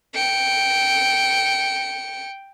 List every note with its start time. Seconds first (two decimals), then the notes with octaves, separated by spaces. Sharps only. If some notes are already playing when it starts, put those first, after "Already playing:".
0.14 G5 C#7